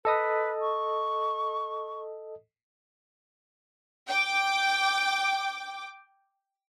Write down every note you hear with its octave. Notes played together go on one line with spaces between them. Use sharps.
A4 B4 D#5 D#6
C#6
G5 D6